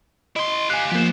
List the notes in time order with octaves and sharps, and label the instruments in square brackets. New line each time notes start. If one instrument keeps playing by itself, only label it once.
[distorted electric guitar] E4 C6 [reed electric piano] D#5
[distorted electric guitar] G4 F5 [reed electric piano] G#5 F#6
[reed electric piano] F3 A#3 [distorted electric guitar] B3 C5